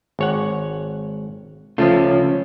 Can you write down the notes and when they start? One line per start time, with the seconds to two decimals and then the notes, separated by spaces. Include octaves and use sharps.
0.19 G#1 C#5 F#5
1.78 C#3 F3 A3 C#4 F4